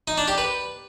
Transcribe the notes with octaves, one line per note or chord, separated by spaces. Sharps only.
D#4
D4
G4
B4